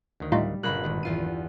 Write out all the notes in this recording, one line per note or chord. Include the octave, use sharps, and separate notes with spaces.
D2 D#3
A2 G3 D#4 F4
G1 A#2 C#3 A#3 B5 F#6
G#1 A#2 D#3
E2 F4 D#7